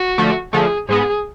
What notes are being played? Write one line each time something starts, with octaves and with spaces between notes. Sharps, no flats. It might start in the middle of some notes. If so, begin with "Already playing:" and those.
Already playing: F#4
D3 F3 A3
D3 F3 A3 G#4
G#2 G#3 B3 G#4